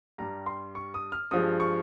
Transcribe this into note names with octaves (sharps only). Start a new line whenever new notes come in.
G2 G3 A#5
C6
C#6
D#6
F6
G2 F3 G#3 D#6
C#6